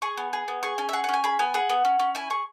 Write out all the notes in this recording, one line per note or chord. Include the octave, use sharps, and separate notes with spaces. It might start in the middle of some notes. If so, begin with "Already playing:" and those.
G#4 C#6
B3
G#4
B3
G#4 C#6
C#4 G#5
E5
G#4 F#5
F#5
C#4 G#5
G#4 B5
B3 G#5
G#4 F#5
B3
C#4
C#4
E4 G#5
G#4 C#6